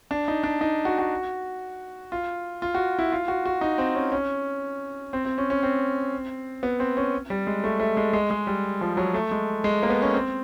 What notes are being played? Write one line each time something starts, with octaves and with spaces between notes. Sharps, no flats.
D4
D#4
D4
D#4
F#4
F#4
F4
F4
F#4
E4
F4
F#4
F#4
D#4
C4
C#4
C#4
C4
C4
C#4
C#4
C4
B3
C4
C#4
G3
G#3
A3
A3
G#3
G#3
G#3
G3
F3
F#3
A3
G#3
G#3
A#3
B3
C#4
C4